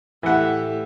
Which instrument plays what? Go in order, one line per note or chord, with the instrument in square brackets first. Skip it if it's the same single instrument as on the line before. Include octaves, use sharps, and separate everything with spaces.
[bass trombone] A2 [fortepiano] E3 F#5 [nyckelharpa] G4 E5